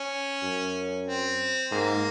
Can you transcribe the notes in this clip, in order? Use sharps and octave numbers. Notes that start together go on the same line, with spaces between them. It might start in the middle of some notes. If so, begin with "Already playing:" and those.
Already playing: C#4
F#2
C4
G#2 A#3